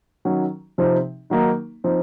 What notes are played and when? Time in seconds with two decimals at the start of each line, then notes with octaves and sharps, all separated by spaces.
0.25 D#3 F#3 C#4
0.78 C3 F3 C4 D#4
1.30 D#3 F#3 A#3 D#4
1.84 F3 C4 D#4